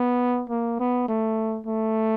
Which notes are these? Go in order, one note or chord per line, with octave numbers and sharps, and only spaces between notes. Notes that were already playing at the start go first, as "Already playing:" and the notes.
Already playing: B3
A#3
B3
A3
A3